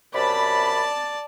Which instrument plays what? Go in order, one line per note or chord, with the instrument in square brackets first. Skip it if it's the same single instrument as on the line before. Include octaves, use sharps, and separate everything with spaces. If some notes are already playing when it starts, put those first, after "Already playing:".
[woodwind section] F#2 C3 B5 [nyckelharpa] D5 A5